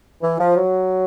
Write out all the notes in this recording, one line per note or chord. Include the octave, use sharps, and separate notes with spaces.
E3
F3
F#3